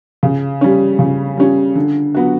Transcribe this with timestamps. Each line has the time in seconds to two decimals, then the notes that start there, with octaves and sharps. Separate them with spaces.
0.23 C#3
0.61 G3 C#4
0.99 C#3
1.37 G3 C#4
1.75 D3
2.15 F#3 B3 F#4